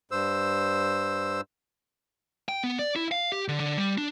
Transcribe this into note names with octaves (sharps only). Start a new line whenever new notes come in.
G2 C5 E6
G5
B3
D5
E4
F5
G4
D3
D3
G3
D4